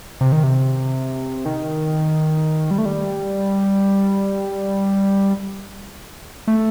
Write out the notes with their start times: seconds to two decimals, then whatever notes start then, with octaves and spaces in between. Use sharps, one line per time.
0.21 C3
0.32 D#3
0.43 C3
1.46 D#3
2.71 G3
2.78 A3
2.85 G3
6.47 A3